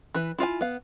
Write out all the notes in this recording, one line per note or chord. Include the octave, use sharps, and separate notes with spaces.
E3 B4
E4 F4 F5 G#5
B3 F5